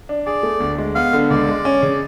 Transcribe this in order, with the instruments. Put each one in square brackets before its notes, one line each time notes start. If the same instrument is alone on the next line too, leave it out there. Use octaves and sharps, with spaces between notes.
[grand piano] D4
[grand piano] G#4 [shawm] D5
[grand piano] A3
D2
G#3
[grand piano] B3 [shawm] F5
[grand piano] D3
[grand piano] C#2 [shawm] D5
[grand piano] G#3
C#4
C#3